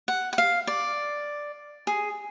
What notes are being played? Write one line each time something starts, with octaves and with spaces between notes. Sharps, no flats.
F#5
F#5
F5
D5
G#4